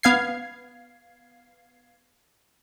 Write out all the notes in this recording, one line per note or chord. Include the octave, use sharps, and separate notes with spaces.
B3 F5 G#6 C7